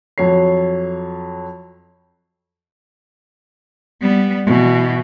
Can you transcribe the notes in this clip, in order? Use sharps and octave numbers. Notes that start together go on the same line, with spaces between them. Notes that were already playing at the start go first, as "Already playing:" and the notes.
F2 F#3 C#5 C7
G3 B3
B2 E3